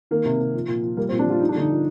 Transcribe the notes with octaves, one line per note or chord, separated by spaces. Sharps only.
D#3 A#3
C3
C3
F3
A#2
F3
G3 A#3
C4
A#2
D4
G3 F4
F3 D#4
D4
D3 D#4
F3